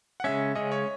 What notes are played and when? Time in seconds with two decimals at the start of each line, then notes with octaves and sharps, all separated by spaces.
0.20 F#5
0.24 C#3 G#3 C#4 E5
0.55 C#3 G#3 C#4 D#5
0.72 C#5